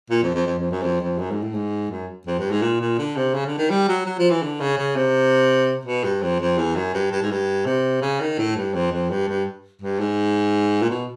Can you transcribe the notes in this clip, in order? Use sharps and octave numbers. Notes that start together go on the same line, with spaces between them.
A#2
F2
F2
F2
F2
F#2
F2
F2
F#2
G#2
A2
G#2
F#2
F2
G2
G#2
A#2
A#2
D3
C3
C#3
D3
D#3
G3
F#3
F#3
F3
E3
D3
C#3
C#3
C3
B2
G2
F2
F2
E2
F#2
G2
G2
G#2
G2
C3
C#3
D#3
A2
G2
F2
F2
G2
G2
G2
G#2
A#2
B2